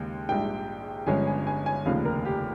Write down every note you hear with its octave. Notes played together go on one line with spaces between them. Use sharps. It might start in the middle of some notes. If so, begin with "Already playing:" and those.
Already playing: D#2 C#3 G#3
A#1 G#2 G3 G5
G1 G2 F3 G#3 C#4 G#5
G#5
G#5
G#5
F1 D#2 C#3 F3 F5
A#4
G4